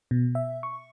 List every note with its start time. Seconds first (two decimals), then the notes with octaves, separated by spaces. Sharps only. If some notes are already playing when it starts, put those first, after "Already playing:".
0.11 B2
0.35 E5
0.63 C#6